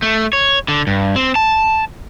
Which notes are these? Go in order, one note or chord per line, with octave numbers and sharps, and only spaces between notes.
A3
C#5
D3
G2
C4
A5